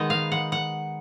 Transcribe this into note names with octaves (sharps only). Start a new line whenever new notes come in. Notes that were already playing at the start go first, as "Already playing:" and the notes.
Already playing: D#3 G#3 B3 D#4 D#5
F5
F#5
F#5